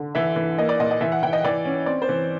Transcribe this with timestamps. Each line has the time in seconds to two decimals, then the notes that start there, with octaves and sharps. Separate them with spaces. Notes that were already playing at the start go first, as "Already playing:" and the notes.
Already playing: D3
0.15 E3 E5
0.36 E3
0.58 A#3 D#5
0.69 D5
0.80 A#2 D#5
0.91 D#5
1.01 E3 E5
1.12 F#5
1.23 E3 G5
1.33 D#5
1.44 E3 D5
1.65 C#4
1.86 C4 D5
2.02 C5
2.09 E3